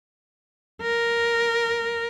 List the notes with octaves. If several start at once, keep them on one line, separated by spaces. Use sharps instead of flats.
A#4